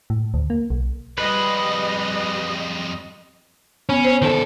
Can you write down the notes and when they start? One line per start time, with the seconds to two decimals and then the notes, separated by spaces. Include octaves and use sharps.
0.10 A2
0.34 D2
0.50 A#3
0.70 B1
1.18 F2 G3 G#3 B4 D#5
3.89 B3 C#4
4.05 C5
4.22 D#3 A4